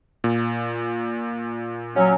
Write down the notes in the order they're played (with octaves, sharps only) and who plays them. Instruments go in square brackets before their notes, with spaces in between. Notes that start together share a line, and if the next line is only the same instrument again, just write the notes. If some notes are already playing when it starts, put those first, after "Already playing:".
[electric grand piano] A#2
[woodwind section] F#3 C#4